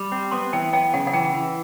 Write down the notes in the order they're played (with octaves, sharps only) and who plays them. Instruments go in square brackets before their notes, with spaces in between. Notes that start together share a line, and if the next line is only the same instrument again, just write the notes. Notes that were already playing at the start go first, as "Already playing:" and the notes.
Already playing: [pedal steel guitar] G3
C4
[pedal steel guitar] B3 [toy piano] C6
[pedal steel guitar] E3 [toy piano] G5
[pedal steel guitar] B3 [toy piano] G5
[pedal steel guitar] C#3 [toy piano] F#5
[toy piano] F#5
[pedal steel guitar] E3 [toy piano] G5
[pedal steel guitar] E3